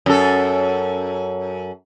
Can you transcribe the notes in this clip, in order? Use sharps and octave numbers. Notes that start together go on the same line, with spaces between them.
F#2 A4